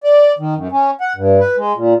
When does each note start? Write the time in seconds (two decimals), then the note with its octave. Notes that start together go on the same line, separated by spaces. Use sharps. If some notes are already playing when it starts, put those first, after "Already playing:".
0.04 D5
0.39 D#3
0.56 F#2
0.72 C#4
1.01 F#5
1.16 G2
1.40 B4
1.57 G#3
1.76 A#2